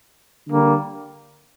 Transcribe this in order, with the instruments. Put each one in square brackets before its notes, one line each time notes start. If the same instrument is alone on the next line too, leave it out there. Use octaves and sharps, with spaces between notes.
[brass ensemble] D3 G3 A#3